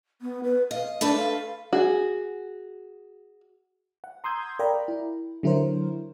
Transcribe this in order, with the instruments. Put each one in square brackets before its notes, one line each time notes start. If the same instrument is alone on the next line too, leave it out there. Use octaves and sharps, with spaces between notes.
[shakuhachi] B3
B4
[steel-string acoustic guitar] D#5 [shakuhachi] F5
[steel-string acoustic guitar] A3 A4 B4 [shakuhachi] D4
[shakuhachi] F5
[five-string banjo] F#4 G#4
[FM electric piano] F#5
A#5 C6 D#6 E6 G6 G#6
A#4 D5 F5 G5 A#5 B5
E4
D3 F#3 E4 F#4 A#4 C5